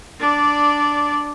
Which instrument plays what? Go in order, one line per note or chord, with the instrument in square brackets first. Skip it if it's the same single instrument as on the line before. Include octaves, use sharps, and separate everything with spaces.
[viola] D4 D5